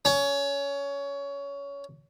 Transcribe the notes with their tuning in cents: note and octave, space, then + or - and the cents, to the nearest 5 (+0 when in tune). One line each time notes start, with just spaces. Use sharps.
C#4 +20